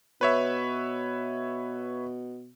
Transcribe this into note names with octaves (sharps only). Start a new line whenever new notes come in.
B2 B4 C#5 E5